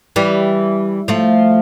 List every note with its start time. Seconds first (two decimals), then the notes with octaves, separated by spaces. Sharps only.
0.16 E3 G3
1.08 F3 A3